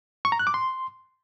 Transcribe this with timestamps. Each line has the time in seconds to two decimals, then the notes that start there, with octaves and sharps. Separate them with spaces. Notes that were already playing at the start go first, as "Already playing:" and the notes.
0.25 C#6
0.32 A#5
0.39 F#6
0.47 D6
0.54 C6